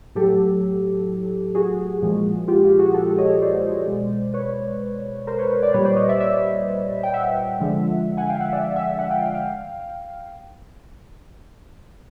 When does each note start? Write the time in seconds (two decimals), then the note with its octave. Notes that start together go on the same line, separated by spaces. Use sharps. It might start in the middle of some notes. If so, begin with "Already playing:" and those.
0.15 A2 F#3 G4 A4
1.55 F#4 G#4
2.02 A#2 F3 G#3
2.48 F4 G4
2.63 F4 G4
2.79 F#4 G#4
2.94 G4 A4
3.06 G4 A4
3.18 C#5 D#5
3.29 C#5 D#5
3.42 C5 D5
3.87 B2 G#3
4.34 B4 C#5
5.27 A#4 C5
5.38 B4 C#5
5.50 B4 C#5
5.62 C5 D5
5.73 A#2 G3 B4 C#5
5.85 C5 D5
5.96 C#5 D#5
6.09 D5 E5
6.20 D5 E5
7.03 G5
7.13 E5 F#5
7.60 D3 F3 G#3
8.17 F#5 G#5
8.29 F5 G5
8.40 E5 F#5
8.52 D5 E5
8.76 E5 F#5
8.99 E5 F#5
9.10 F5 G5
9.22 F5 G5
9.34 F5 G5